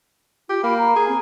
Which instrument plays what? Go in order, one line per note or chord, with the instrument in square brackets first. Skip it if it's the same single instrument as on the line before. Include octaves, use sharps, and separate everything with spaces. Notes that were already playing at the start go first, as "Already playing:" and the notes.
[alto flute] F4 [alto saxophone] G4
[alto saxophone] A#3 [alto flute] B5
[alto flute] A#5
[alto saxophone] G#4
[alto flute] C4